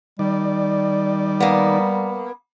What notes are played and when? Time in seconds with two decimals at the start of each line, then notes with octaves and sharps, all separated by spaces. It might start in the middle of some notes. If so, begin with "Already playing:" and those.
0.19 D#3 G3 D5
1.40 A#3 B3